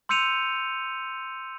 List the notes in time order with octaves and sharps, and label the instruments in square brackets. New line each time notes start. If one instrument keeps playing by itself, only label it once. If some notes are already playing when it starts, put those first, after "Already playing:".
[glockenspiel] C6 E6 G6 C#7 D#7 F7